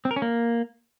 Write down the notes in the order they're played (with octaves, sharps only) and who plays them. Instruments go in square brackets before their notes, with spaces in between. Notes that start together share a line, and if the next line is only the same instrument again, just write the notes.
[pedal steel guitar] C4
A#4
C#4
A#3